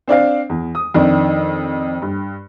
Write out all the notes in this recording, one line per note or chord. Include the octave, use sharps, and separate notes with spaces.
C4 D4 D5 F5
E2
D#6
F2 D#3 D4
G2